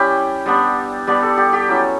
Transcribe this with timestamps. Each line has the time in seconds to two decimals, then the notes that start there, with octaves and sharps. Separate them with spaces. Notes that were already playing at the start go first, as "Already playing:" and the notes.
Already playing: G3 C#4 E4 G4
0.46 G3 B3 D4
1.07 G3 B3 D4 D5
1.23 A4
1.37 G4
1.53 G4
1.68 F#3 C#4 E4